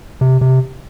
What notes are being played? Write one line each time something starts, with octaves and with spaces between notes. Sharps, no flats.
C3
C3